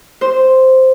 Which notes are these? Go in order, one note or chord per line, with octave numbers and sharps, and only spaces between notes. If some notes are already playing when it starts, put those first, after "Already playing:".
C5